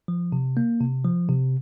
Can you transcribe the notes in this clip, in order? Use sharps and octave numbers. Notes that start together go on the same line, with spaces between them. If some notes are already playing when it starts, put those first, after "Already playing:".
F3
C3
A#3
C3
F3
C3